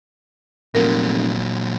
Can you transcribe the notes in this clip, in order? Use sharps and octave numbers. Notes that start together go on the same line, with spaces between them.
F1 A#2 F#3 A#4